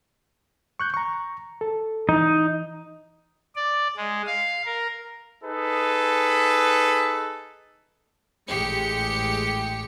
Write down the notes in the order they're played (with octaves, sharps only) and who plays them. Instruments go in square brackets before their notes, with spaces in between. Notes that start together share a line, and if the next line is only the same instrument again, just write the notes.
[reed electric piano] C#6 F#6 G6
A#5 C#6
A4
[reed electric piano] E3 [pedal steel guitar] D#4
[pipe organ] D5
G#3
F5
A#4
[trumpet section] D#4 G#4 A4 B4
[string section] A1 G#3 G4 C#7